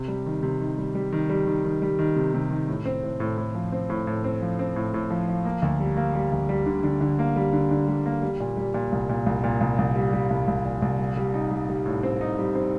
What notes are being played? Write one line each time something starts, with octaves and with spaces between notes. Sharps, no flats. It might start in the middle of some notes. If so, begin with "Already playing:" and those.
Already playing: C3
G3
D#3
C3
D#3
G3
G3
D#3
G3
D#3
D#3
G3
D#3
C3
C3
D#3
A2
C4
A2
A2
A2
F3
C4
A2
A2
C4
F3
C4
A2
A2
F3
F3
A#3
D2
G3
A#3
G3
D2
G3
D3
D3
D3
A#3
G3
D3
D3
G3
A#3
G3
A#2
G3
A#2
C2
A#2
C2
A#2
C2
C2
G3
G3
C2
C2
A#2
C2
G3
G3
D#4
G3
G3
A2
C4
D#4
G3
C4